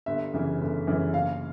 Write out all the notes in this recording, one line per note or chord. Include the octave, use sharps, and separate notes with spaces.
G1 E5
F#2 C#3 E3
G1
F#2 C#3 E3
F#1 F5